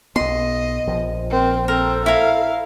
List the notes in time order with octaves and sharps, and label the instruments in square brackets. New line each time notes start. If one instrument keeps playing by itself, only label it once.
[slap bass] B1 B3 [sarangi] D#5 [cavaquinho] C6
[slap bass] A#1 F3
[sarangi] C4 [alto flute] A#4
[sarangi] C4 [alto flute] A4 [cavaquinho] A#4
[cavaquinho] E4 A#4 [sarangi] F5